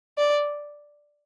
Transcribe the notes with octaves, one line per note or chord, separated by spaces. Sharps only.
D5